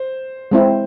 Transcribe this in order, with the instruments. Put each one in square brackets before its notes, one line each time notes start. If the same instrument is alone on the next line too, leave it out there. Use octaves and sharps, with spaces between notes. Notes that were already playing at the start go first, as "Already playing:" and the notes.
Already playing: [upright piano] C5
[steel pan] G#3 C4 E4